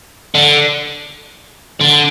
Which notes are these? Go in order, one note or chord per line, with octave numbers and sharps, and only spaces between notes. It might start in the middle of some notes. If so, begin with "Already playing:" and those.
D3
D3